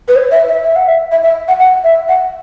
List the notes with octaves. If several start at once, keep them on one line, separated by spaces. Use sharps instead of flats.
B4
C#5
E5
E5
E5
F#5
E5
E5
E5
F#5
F#5
E5
F#5